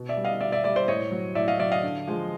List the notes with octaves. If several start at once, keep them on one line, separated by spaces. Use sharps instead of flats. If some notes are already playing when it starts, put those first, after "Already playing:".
Already playing: B2
D5 E5
G3
D#5 F5
B2 D5 E5
D5 E5
G3 D5 E5
C5 D5
A2 C#5 D#5
F#3
A2 D5 E5
D#5 F5
F#3 D5 E5
D#5 F5
D3
F3 G#3